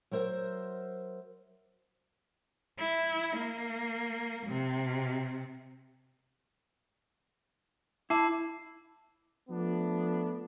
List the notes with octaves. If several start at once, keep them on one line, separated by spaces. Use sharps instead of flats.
F#3 A#4 C5 E5
E4
A#3
C3
E4 A5 D6 C7
F3 A3 B3 D4